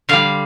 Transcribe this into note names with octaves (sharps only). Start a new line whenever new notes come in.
D3 G3 F5